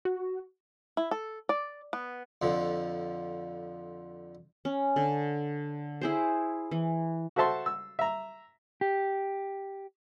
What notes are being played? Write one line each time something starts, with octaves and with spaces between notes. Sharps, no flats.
F#4
E4
A4
D5
B3
F2 D3 F3
C#4
D3
E4 G#4 C5
E3
F#4 A4 C5 E5 A5 C6
E6
E5 A#5
G4